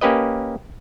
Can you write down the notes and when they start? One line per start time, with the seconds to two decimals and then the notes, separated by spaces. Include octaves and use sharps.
0.01 A#3 C#4 G4 B4 D#5